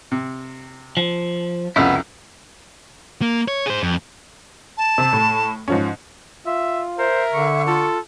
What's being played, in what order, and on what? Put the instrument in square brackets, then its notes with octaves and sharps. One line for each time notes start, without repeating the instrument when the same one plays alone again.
[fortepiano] C3
[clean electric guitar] F3
[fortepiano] C2 F2 C#3 [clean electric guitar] B3 E4
[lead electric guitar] A#3
C#5
G#4 C5
F2
[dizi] A5
[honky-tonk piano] C3
A2
G#2 F3 C#4
[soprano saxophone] F4 [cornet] E5
[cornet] A#4 [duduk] C5 [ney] E5
[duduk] D3 [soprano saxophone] C#6
[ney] F4 [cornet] A4